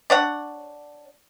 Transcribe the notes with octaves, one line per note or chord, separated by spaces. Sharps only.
D4 C#5 F#5